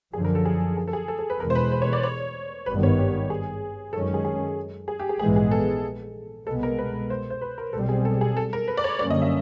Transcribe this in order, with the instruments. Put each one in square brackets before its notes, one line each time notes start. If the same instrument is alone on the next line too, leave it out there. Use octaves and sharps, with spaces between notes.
[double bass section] F#2 D3 F3 [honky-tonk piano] G#4
[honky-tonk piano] A#4
A4
G#4
G#4
A4
G#4
A4
A4
B4
[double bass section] E2 B2 G#3 [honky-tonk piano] A#4
[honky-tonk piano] C5
B4
C5
C#5
D5
C#5
[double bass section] G#1 G2 D#3 G3 B3 [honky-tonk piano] B4
[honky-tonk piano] C#5
G4
G#4
[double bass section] F#2 D#3 G#3 C#4 [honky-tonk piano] A4
[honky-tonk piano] G#4
G#4
G#4
G4
G#4
[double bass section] A#1 G#2 E3 G#3 B3 [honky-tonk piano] G#4
[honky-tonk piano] G#4
A4
[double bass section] C2 B2 G#3 B3 [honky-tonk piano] A4
[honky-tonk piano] A#4
B4
C5
C5
B4
A#4
[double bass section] B1 B2 G3 C4 [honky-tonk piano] A4
[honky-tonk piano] G#4
A4
G#4
A4
A#4
B4
D5
C#5
[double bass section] F#2 D3 G3 A#3 C#4 [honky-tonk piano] D5
[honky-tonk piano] D#5
E5